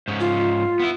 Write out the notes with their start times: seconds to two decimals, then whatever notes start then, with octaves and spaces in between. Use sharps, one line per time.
0.08 G#2 C#4
0.20 F4
0.80 B3 E4